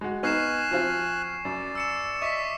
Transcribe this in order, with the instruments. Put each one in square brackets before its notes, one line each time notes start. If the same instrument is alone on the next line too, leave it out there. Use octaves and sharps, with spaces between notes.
[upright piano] G#3 F#4
[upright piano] B3 D#4 [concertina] G#5 F6 F#6 [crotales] C#6 C7 E7
[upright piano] F3 C4 F4
[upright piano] F#2 [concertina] D5
[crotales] E6 C#7 E7
[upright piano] D#5 E5 [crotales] C#6 D6 B6